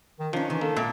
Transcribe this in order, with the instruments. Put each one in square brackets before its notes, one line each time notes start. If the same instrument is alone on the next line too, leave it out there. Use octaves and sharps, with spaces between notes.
[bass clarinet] D#3
[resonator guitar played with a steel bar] D#3 C#4 [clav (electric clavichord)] F3 [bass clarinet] D4
[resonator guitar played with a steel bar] D#3 [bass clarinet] E3
[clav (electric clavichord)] A#3 [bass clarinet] A4
[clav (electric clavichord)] G#1 E5 [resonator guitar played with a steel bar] A#2